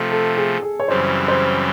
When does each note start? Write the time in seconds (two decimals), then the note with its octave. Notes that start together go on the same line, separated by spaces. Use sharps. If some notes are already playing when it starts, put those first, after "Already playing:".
Already playing: C3 F3 A3 A4
0.11 A4
0.37 G#4
0.63 G#4
0.80 C#5
0.88 F#2 C#3 E3 G3 C4 C5
1.28 C5